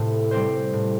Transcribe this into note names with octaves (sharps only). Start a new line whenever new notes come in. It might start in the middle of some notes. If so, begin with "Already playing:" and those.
Already playing: A2 C3 A3 C4 G4 C5
G3 C4 G4 C5
A2